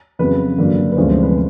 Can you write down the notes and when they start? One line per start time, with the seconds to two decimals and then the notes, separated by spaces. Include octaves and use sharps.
0.19 F2 C#3 F#3 B3 B4
0.58 G2 D3 F#3 A#3
0.92 B4
0.97 D2 C3 F3 G#3 C#4 C5
1.10 C5
1.23 B4